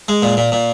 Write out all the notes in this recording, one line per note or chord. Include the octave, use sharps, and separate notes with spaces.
G#3
A#2
A#2
A#2